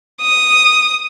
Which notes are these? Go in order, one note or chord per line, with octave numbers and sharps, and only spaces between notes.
D#6